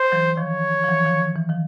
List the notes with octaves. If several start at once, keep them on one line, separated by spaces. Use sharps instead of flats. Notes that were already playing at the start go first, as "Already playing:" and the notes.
Already playing: C5
E3 F#3
D#3 F3 C#5
F3
E3 F#3
D#3 F3
F3
E3
D#3 F3